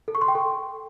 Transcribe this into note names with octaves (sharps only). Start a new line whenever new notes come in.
A4
C#6
C6
G5
A4